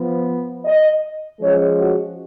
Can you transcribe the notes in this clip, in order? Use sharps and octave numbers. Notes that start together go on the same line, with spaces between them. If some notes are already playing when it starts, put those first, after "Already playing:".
Already playing: F3 B3
D#5
F3 G#3 C#4 C#5
F#4